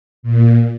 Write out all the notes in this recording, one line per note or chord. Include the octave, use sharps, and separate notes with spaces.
A#2